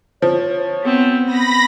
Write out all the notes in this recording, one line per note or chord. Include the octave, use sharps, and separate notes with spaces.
F3 C#5
B3 C4
B3 B5 A#6